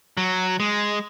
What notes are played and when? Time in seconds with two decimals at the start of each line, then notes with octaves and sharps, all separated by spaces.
0.17 F#3
0.60 G#3